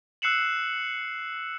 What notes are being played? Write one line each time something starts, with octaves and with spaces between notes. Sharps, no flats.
E6 F#6 C7 C#7 E7 F#7